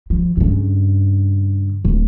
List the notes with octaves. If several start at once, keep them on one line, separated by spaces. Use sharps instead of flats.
F3
G2 C#3
D1